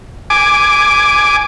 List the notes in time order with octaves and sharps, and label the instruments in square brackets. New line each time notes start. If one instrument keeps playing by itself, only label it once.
[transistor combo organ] G#5 D6